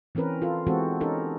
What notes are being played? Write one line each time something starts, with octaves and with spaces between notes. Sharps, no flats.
E3 C4 C#4 A#4 B4
F4 A4
E3 G#3 B3 C4 F#4 A4
C#4 D#4 G4 A4 A#4